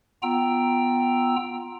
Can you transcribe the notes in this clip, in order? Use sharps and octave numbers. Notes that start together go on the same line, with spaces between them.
B3 F4 G5 A#5 E6